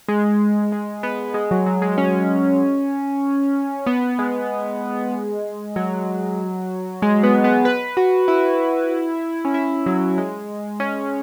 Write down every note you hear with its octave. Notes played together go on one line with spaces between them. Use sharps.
G#3
G#3
B3
G#3
F#3
F#3
G#3
C#4
B3
G#3
F#3
G#3
B3
B3
B4
F#4
E4
C#4
E4
F#3
G#3
C#4